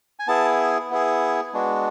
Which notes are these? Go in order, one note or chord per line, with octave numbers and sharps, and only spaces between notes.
G#5
B3 E4 G#4 A5
B3 E4 G#4
G#3 B3 D4 F#4